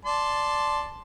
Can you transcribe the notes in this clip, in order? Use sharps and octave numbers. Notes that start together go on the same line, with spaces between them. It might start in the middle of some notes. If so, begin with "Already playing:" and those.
D5 A5 C6